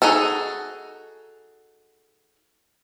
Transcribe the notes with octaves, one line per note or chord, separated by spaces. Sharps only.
D#4 F#4 G#4 A4